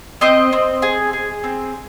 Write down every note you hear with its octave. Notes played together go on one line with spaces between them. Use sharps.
C4 C5 D#5
C4
G#4
G#4
C4